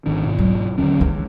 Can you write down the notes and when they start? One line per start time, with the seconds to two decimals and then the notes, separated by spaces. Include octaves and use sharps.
0.06 G#1 D#3 D4
0.24 G#2 B2
0.39 F#3
0.78 D#2 D3 C#4
1.01 C#2 D#3 E3